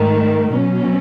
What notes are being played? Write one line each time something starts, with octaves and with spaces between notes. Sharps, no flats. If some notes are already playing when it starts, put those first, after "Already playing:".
Already playing: G#2 D#3 A3
B2 F#3 C#4